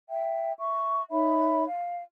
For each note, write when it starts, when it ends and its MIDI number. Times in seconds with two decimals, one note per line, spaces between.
0.09 0.53 76
0.09 0.53 79
0.57 1.01 76
0.57 1.01 85
1.11 1.64 63
1.11 1.64 73
1.11 1.64 76
1.11 1.64 83
1.65 2.01 77